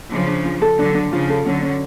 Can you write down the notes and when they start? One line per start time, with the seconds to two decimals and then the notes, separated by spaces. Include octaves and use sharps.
0.11 C#3 F3 D4
0.27 D4
0.45 F4
0.62 A4
0.79 D3 F#3 D4
0.95 D4
1.12 C#3 F3 F4
1.29 A4
1.46 D3 F#3 C#4
1.62 C#4